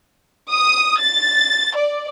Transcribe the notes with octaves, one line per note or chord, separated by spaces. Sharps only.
D#6
A6
D5